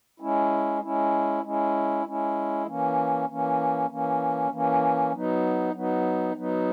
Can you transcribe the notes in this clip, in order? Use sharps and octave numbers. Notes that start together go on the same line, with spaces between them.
G#3 C#4 E4
G#3 C#4 E4
G#3 C#4 E4
G#3 C#4 E4
E3 A#3 C#4
E3 A#3 C#4
E3 A#3 C#4
E3 A#3 C#4
F#3 B3 D#4
F#3 B3 D#4
F#3 B3 D#4